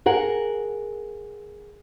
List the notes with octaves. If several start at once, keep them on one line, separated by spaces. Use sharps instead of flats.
G#4 A#4 F#5